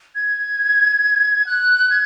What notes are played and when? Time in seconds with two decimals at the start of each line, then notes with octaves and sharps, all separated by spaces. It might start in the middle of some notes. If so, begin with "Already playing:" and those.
0.15 G#6
1.47 F#6
1.90 G#6